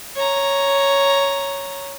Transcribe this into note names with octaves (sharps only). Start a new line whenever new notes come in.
C#5 A#5